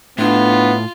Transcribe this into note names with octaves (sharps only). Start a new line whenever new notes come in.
A2 B3 D4 F4